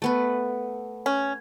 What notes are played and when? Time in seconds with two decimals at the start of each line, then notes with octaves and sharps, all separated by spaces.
0.02 A3 B3 B4
1.06 C#4